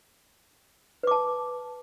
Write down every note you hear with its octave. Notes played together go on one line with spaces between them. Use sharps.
B4 A5 D6